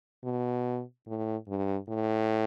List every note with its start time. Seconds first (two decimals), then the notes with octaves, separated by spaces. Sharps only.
0.24 B2
1.07 A2
1.48 G2
1.89 A2